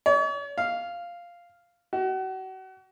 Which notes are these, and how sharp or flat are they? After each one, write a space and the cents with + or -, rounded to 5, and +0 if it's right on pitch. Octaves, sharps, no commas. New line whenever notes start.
C#5 +45
F5 -5
F#4 +35